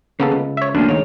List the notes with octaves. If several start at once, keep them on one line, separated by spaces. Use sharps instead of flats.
C#3 A#3 B3 A4
C#2
C#5 E5
D2 F3 A#3 C#4 D4
G#2 D#3 C#5